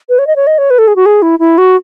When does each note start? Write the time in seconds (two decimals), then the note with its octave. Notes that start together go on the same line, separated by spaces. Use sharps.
0.09 B4
0.19 C#5
0.27 D#5
0.36 C#5
0.47 D#5
0.58 C#5
0.70 B4
0.79 A4
0.88 G#4
0.96 F#4
1.06 G#4
1.22 E4
1.39 E4
1.58 F#4